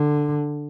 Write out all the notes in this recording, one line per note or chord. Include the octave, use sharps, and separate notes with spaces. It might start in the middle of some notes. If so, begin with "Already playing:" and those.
Already playing: D3